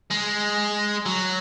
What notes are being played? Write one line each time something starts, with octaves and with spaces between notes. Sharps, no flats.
G#3
F#3